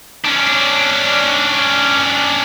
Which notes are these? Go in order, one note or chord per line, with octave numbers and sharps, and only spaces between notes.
C#4 D4